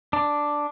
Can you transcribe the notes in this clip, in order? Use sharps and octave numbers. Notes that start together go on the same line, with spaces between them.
D4